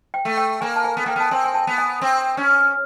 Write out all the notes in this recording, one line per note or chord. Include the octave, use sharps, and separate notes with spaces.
G5
A3
G5
A#3 G#5
A5
G#5
B3
A#3 G5
B3 A5
C4 G#5
G#5
A5
B3
G#5
C4
C#4